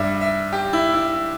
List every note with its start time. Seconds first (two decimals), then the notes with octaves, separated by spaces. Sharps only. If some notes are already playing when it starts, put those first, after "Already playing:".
Already playing: G2 G3 E5
0.21 E5
0.53 G4
0.73 E4
0.94 E4